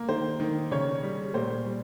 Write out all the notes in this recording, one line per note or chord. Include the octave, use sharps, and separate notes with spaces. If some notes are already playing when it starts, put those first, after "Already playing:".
Already playing: A#3
D#3 C5
D#3
C#3 C#5
G3
A#2 C5
G3